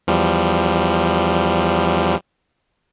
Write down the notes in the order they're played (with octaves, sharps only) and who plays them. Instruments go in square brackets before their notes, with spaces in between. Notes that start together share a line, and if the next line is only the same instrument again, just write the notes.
[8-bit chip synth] E2 F3 G3